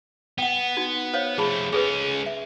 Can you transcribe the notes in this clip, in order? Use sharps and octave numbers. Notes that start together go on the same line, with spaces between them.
B3 F#5 G5
D#4 F#4
C5 C#5 F5
F3 A3 G#4 A5 B5
G#3 C#4 G#4 A4 B4
E5